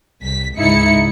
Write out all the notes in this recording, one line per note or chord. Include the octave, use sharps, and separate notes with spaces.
C2 B6
C#2 G#2 D#4 E4 C#7